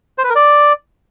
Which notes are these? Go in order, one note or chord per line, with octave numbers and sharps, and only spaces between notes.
C5
B4
A#4
D5